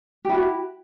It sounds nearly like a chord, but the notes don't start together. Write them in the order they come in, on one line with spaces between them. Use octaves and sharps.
G4 E4 F#4